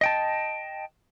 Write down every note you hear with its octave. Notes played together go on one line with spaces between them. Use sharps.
D#5 G5 A5